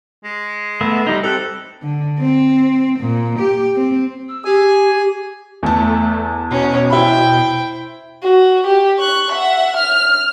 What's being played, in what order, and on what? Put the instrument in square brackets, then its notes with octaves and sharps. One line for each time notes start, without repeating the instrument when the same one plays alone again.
[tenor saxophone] G#3
[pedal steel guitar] A3 B3 E5
G3 D#4
[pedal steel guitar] C4 G4 F#6 [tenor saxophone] A4
[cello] D3
C4
A#2
G4
C4
[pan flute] E6
[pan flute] G4 [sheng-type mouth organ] G#4 G#5
[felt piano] E2 A5 [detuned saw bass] A3
[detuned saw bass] B2 [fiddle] C#4
[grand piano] E4 B5 [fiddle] C5 G5
[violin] F#4
G4
C#6 F#6
E5 F#5
F6